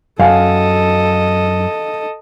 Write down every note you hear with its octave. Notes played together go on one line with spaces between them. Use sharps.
F#2 A4 D#5 F5 G#5